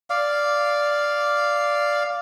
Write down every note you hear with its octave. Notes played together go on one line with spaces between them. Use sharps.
D5 F5